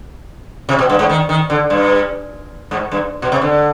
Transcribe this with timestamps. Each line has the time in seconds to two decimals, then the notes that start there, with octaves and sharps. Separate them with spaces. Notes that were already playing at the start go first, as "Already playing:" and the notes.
0.69 C3
0.79 B2
0.89 G2
0.99 G#2
1.09 D#3
1.29 D#3
1.50 D3
1.70 G2
2.71 G#2
2.92 G2
3.22 B2
3.32 C3
3.42 D3